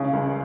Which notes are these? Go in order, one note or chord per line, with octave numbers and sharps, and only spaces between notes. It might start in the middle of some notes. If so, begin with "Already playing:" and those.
Already playing: C#2 C#3
C#2